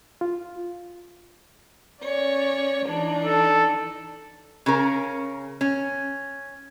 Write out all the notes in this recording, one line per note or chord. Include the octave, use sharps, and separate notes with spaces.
F4
C#4 C#5 D5
E3 D4 D#4
A4
C#3 C#4 A#4
C#4